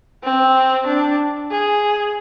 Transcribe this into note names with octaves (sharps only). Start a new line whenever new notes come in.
C4
D4
G#4